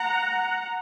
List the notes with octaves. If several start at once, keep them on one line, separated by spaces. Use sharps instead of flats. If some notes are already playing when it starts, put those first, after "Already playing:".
Already playing: F#5 A#5